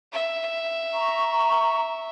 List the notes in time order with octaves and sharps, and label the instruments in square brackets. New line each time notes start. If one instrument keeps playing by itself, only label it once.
[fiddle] E5
[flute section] A#5 C#6